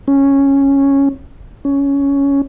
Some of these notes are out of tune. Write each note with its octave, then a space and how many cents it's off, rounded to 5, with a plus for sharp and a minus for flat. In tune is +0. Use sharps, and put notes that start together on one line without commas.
C#4 -5
C#4 +10